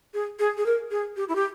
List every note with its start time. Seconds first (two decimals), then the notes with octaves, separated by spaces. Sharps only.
0.14 G#4
0.39 G#4
0.58 G#4
0.66 A#4
0.91 G#4
1.17 G4
1.29 E4
1.36 G4